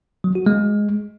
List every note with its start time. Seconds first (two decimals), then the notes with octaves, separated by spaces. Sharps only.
0.24 F#3
0.35 F#4
0.46 G#3